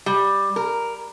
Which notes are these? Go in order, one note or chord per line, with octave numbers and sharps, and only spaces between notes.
G3
A#4